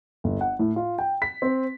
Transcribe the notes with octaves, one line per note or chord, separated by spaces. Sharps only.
G1
F#5
A2
F4
G5
B6
C4